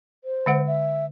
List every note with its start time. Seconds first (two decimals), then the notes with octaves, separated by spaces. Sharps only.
0.24 C5
0.46 D3 G#3 F#5
0.67 E5